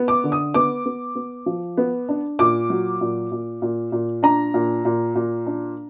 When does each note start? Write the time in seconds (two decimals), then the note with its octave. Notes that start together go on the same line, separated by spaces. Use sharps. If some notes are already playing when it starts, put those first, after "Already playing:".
Already playing: B3
0.08 D6
0.24 D3
0.32 D#6
0.54 B3 D6
0.86 B3
1.15 B3
1.46 F3
1.77 B3
2.09 D4
2.39 A#2 D6
2.70 F#3
3.01 A#2
3.31 A#2
3.62 A#2
3.92 A#2
4.23 D4 A#5
4.54 A#2
4.85 A#2
5.15 A#2
5.47 D4